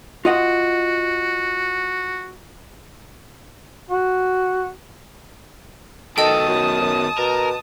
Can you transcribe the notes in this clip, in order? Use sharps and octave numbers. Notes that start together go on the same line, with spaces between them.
F4 F#4 D#5 F#5
F#4
B2 D#3 A4 D#5 G5 A5 D#6
F#2
F#2
B2 A#4